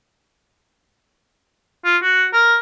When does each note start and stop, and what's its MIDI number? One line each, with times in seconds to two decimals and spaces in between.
1.85 1.97 65
2.03 2.27 66
2.33 2.58 70